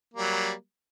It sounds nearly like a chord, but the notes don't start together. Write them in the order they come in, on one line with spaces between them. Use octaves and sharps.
A#3 G3 F#3